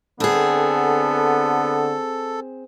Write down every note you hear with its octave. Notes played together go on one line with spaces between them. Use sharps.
D3 B3 C4 G#4 A4